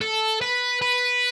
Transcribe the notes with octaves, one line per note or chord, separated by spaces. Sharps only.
A4
B4
B4